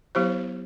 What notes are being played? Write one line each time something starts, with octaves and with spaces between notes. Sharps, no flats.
F#3 B3 E4 G4 C5